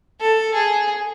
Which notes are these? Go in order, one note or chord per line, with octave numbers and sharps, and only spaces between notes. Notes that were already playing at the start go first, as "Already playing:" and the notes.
A4
G#4